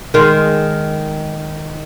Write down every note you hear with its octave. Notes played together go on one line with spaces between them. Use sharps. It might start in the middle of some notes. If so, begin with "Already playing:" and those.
D#3 G#3